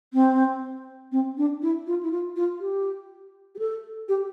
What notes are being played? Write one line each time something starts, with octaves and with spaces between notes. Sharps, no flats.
C4
C4
D4
E4
F4
E4
F4
F4
G4
G4
A4
G4